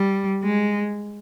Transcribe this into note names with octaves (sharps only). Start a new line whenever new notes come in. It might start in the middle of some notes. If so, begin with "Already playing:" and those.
Already playing: G3
G#3